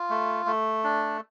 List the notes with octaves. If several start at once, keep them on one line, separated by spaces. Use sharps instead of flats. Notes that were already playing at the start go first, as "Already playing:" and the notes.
Already playing: F4
A3
A3
D4